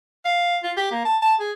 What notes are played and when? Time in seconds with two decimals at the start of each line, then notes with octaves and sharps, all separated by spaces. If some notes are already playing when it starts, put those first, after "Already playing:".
0.25 F5
0.63 F4
0.77 G4
0.92 A#3
1.05 A5
1.22 A5
1.40 G#4